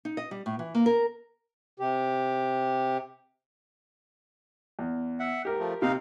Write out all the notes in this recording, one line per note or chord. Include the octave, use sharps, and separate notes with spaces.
D#4
D#5
G3
A2
E3
A#3
A#4
C3 G4
E2
E5 F#5
G#2 G4 A#4
F3 A3
C3 D#4 F5